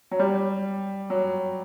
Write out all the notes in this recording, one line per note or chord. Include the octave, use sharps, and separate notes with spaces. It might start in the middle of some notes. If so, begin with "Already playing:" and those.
F#3
G3
F#3